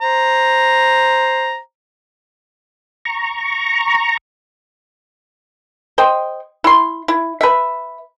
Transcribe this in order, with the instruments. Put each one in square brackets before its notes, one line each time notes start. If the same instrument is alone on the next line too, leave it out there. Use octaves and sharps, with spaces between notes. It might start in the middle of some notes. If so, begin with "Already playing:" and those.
[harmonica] C5 A#5
[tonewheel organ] A#5 C#6
[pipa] C5 D#5 G5
E4 C6
E4
B4 E5